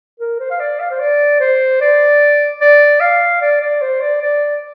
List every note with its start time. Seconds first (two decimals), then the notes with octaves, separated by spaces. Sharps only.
0.20 A#4
0.40 C5
0.50 F5
0.60 D5
0.80 F5
0.90 C5
1.00 D5
1.40 C5
1.81 D5
2.61 D5
3.00 F5
3.41 D5
3.61 D5
3.82 C5
4.01 D5
4.21 D5